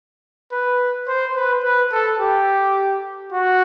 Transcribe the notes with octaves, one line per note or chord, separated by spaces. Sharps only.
B4
C5
B4
B4
A4
G4
F#4